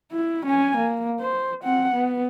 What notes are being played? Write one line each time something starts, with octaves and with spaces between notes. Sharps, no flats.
E4
C#4 G#5
A#3
C5
C4 F#5
B3